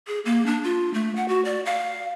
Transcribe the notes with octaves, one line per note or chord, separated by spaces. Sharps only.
G#4
A#3
D4
F4
A3
F#5
F#4
D5
F5